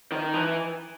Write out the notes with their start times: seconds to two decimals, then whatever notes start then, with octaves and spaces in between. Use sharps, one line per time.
0.12 D#3
0.34 E3